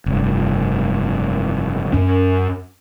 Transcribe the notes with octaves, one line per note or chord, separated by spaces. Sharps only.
F1 G2
F#2 C#4